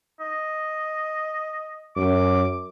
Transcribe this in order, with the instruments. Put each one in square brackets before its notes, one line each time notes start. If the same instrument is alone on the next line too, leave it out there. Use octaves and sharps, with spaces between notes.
[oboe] D#5
[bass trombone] F#2 [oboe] D6